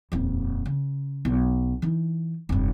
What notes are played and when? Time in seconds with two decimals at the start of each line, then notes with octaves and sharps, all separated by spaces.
0.12 D#1 F2
0.66 C#3
1.25 B1
1.82 E3 D#4
2.49 F1 G2